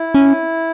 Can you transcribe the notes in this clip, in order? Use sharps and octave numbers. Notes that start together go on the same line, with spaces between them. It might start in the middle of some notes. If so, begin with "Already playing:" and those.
Already playing: E4
C#4